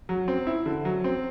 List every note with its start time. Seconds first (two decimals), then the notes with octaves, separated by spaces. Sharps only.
0.09 F#3
0.28 C4
0.47 E4
0.66 D3
0.85 F#3
1.04 C4